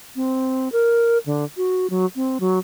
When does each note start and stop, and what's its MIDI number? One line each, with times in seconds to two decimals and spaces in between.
0.16 0.69 60
0.72 1.18 70
1.26 1.45 50
1.57 1.87 66
1.90 2.06 54
2.16 2.38 60
2.40 2.59 54